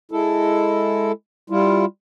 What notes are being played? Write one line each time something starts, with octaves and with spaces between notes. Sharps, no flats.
G#3 E4 A4
G3 E4 F4